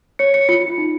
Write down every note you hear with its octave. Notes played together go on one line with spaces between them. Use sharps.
C#5 C#7
C#5 C#7
F4 C#7
F4
D#4